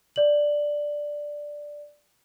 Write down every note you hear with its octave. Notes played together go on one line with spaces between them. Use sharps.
D5 F#7